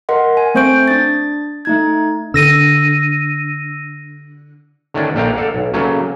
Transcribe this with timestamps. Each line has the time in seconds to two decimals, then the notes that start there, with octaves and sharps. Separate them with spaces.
0.09 A#4 D#5 F#5 C6
0.37 G#5
0.55 A3 C4 C5 C#6 G6 D7
0.88 D4 A6
1.65 A3 D#4 G#6
2.34 D3 E6 A#6 D#7
4.94 D3 D#3 A3 C#4 D4
5.15 A#1 A3 A#3 D4 G5 A#5
5.35 A4 D5 F5 F#5
5.54 B1
5.73 C#3 F#3 A3 A#3 C#4